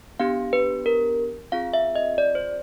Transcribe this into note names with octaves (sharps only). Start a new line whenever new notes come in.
B3 D4 G4 F5
B4
A#4
C4 F4 G#4 F5
E5
D#5
D5
C5